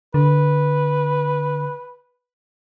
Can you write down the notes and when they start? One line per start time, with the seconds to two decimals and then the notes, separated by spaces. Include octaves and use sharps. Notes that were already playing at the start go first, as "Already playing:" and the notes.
0.14 D3 B4